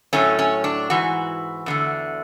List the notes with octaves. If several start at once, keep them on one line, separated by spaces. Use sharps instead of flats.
A2 F#3 A3 C#4
C#4
D4
G#2 E3 F#4
E2 D3 A3